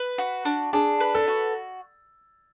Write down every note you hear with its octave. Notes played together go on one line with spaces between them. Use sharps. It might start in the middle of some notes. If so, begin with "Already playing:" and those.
Already playing: B4
F#4
D4
D4 G#4
B4
A4
F#4